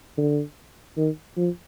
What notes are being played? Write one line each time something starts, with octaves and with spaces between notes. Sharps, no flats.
D3
D#3
F3